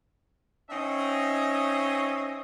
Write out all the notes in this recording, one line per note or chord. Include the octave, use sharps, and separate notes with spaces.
C4 C#4 D#4 D#5 E5